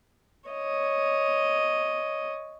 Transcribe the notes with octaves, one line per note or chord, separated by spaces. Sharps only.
C#5 D#5